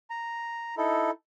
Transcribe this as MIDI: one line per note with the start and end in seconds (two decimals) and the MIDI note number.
0.10 0.75 82
0.77 1.11 63
0.77 1.11 64
0.77 1.11 69